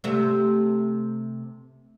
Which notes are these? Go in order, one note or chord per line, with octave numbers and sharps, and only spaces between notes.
C3 A3